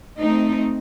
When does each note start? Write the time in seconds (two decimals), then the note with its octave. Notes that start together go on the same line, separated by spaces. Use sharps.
0.18 A3 C4 D#4